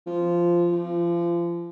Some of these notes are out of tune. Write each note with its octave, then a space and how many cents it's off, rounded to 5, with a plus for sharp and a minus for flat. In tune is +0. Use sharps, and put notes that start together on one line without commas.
F3 -10
F3 -30